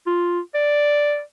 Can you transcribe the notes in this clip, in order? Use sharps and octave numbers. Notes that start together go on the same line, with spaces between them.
F4
D5